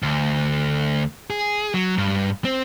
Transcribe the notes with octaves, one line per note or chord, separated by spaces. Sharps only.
D2
G#4
F#3
G2
C4